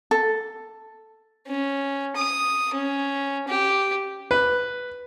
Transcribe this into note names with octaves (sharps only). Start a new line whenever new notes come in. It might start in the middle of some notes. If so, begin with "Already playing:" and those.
A4
C#4
D#6
C#4
G4
B4